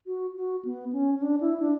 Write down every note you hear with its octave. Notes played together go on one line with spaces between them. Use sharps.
F#4
F#4
B3
C#4
C#4
D4
E4
D4